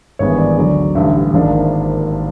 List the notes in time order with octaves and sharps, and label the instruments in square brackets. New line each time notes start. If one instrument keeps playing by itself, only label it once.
[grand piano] G#1 G2 E3 G#3 B3 C#5
D5
D2 D3 F#3 D5
A1 G2 D3 E5
G#1 G#2 F3 A#3 D4